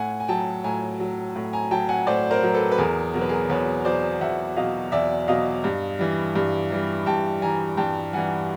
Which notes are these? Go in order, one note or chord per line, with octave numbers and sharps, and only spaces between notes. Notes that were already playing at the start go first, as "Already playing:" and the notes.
Already playing: A2 F#5 G#5
G#5
F#3 G5 A5
A2 G#5 A#5
F#3
A2
G#5 A#5
F#3 G5 A5
F#5 G#5
A2 C5 D5
A#4 C5
F#3 A#4
A4 B4
B4
E2 G#4 A#4
B2 F#3 A#4
B4
G#4 A#4
E2 B4 C#5
B2 F#3 C5 D5
E2 E5 F#5
B2 F#3 D#5 F5
E2 D5 E5
B2 F#3 D#5 F5
G2
E3 G3
G2
E3 G3
G2 G5 A5
E3 G3 G#5 A#5
G2 G5 A5
E3 G3 F#5 G#5